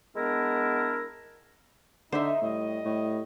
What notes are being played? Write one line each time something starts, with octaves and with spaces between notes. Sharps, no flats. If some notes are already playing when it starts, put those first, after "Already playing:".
G#3 B3 D4 E4 A#4
D3 D#4 C5 E5
A2 G3 D#5
A2